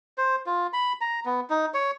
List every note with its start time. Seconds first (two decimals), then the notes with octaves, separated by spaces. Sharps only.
0.18 C5
0.46 F4
0.73 B5
1.01 A#5
1.25 B3
1.50 D#4
1.74 C#5